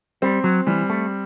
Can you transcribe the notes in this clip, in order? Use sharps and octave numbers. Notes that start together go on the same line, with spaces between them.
G3 C4
F#3
E3 G3
A3